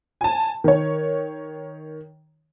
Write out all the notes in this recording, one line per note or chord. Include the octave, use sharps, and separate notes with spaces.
G#5 A5
D#3 C#5